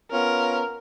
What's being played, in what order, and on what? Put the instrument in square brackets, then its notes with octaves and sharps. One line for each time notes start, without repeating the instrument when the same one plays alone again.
[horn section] B3 C#4 F4 [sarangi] A#4